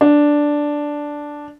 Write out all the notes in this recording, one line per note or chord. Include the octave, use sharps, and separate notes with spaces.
D4